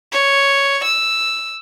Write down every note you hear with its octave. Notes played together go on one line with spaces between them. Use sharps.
C#5
E6